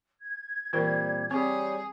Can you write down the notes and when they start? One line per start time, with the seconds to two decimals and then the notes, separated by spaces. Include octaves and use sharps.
0.21 G#6
0.73 A#2 E3 G3 C4 F4 A#4
1.31 G3 C4 G4 G#4 C#5